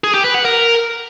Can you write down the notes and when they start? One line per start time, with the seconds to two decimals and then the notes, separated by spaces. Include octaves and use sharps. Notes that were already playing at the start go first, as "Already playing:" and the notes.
0.04 G#4
0.14 G4
0.24 B4
0.34 F#5
0.45 A#4